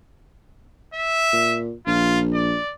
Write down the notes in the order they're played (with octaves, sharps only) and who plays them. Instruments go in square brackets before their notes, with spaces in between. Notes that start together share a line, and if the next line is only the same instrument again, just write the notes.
[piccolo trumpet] E5
[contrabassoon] A#2
[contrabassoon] A#1 [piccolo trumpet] F4
[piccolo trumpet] D5